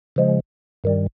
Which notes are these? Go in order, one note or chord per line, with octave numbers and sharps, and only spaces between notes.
C#3 F3 G#3
G2 D#3 G3